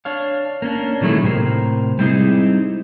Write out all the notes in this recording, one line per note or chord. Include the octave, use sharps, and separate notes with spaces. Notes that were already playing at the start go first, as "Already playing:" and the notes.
D4 C#5 F5
A#3 C#4 D4
A#2 D#3 F#3 G#3 A3 E4
A2 C3 A#4 C5
G3 G#3 C4 D#4 E4 G#4